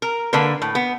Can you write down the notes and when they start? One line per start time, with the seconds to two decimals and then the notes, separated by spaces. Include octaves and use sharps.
0.02 A#4
0.33 D3 A#3 D4 B4
0.62 A2
0.75 B3